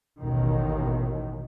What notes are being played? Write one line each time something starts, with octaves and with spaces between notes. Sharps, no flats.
A1 D#2 B2 D#3